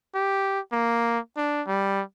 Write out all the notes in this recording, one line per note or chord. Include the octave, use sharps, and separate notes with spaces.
G4
A#3
D4
G3